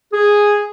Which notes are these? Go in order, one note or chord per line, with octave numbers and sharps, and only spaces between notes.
G#4